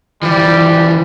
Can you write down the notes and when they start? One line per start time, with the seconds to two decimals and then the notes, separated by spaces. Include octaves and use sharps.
0.23 E3 F3 G3